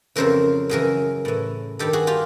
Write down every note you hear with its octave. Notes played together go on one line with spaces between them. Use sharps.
F2 C#3 E3 A#4 C5
F#2 C#3 E3 G#4 A#4
A2 E3
G2 D#3 G4 A4
F#4 G#4
F4 G4